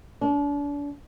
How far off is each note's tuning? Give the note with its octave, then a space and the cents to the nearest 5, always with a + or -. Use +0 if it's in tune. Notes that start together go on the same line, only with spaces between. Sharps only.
D4 -35